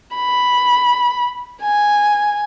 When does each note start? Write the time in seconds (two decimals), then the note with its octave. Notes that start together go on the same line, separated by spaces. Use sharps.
0.16 B5
1.63 G#5